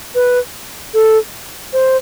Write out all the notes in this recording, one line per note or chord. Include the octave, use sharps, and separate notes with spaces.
B4
A4
C5